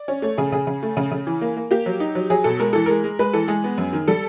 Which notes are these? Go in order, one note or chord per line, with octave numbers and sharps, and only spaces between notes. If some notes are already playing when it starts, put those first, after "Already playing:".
Already playing: D5
C#4
A3 C#5
C#3 G#4
C#3 G#4
C#3
A3
C#3
C#3
E3
A#3
A#3
A#3 G4
F#3
D#4
F#3
F#3 G#4
B2 A4
G#3 A#4
E3 A4
G#3 A#4
G#3
G#3 B4
E3 A4
G#3 G#4
B3
F#2
D#3
G3 A4